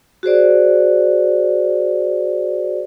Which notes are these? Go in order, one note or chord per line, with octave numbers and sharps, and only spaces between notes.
F#4 G#4 C5 D5